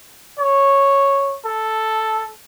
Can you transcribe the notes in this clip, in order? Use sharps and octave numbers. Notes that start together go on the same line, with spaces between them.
C#5
A4